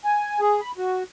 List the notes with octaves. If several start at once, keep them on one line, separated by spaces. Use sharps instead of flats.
G#5
G#4
B5
F#4